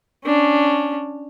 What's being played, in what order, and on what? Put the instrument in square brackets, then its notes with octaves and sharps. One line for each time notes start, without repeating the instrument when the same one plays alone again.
[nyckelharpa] C#4 D4